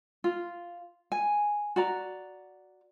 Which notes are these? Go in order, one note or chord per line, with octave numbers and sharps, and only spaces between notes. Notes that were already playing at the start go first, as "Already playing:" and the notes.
F4
G#5
F#4 D5 A#5